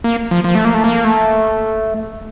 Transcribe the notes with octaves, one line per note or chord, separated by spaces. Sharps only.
A#3
F3
F3
A3
A#3
A3
A#3
A3